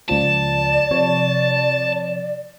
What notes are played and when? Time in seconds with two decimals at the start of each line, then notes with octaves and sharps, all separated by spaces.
0.09 C#2 F3 D5 A5
0.91 C3 F3 C#5